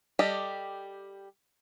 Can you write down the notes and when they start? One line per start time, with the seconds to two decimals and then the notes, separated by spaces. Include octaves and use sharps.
0.19 G3 G4 A4 D#5